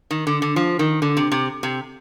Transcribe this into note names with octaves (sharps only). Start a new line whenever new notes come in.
D#3
D3
D3
F3
D#3
D3
C3
C3
C3